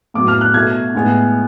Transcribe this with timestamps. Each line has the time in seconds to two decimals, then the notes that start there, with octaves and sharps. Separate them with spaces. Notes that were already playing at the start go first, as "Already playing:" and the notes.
0.14 A2 F#3 B3 D6
0.28 F6
0.41 F#6
0.54 B2 A3 G#6
0.95 A2 G#3 B3